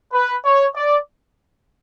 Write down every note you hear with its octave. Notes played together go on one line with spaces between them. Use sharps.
B4
C#5
D5